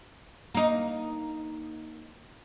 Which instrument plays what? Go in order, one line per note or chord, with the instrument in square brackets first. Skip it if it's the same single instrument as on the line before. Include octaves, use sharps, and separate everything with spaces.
[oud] A#3 D#4